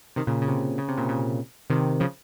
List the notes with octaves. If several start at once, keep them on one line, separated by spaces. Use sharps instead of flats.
C3 D#3
A#2 C#3
C#3
C3
C#3
C3
A#2 C#3
A#2 C#3
C3 D#3
C#3 F3